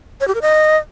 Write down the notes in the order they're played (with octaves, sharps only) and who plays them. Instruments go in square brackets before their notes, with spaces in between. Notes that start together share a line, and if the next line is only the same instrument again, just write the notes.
[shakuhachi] C#5
G4
A#4
D#5